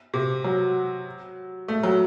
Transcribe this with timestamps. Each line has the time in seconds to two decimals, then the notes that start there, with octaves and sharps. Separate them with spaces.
0.14 C3
0.44 F#3
1.68 A3
1.83 F#3